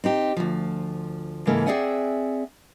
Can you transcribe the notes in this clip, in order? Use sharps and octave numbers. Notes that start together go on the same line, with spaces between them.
C4 D#4 G4
D2 F3
G#2 C#3 E3 G#3 A#3 A4
C4 G#4 D5 E5 F#5 G#5